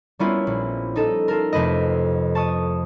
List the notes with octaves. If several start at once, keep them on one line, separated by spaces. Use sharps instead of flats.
G3 A#3 B3 C#4 E4 F4
A#1
D#4 A4 D#5
F4 A4 A#4
F2 C3 A3 B4 D#5
A5 C#6 D#6